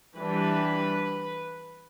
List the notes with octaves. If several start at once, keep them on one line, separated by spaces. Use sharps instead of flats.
E3 G3 D4 B4